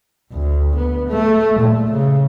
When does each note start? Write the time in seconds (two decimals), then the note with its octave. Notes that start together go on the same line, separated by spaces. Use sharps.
0.32 D2
0.75 B3
1.08 A3
1.59 A#2
1.90 C#3